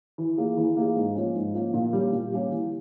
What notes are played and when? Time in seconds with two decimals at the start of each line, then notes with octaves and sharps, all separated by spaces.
0.18 E3
0.38 A#3 F4 G#4
0.57 E3
0.77 A#3 F4 G#4
0.96 G#2
1.15 F3 A#3 C#4
1.35 G#2
1.54 F3 A#3 C#4
1.74 A#2
1.93 G3 A#3 C#4 G4
2.12 A#2
2.32 G3 A#3 C#4 G4
2.51 E3